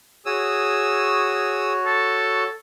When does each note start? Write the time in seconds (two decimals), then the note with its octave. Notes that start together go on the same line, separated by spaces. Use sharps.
0.26 F#4 G#4 C#5 D#6 E6
1.85 A4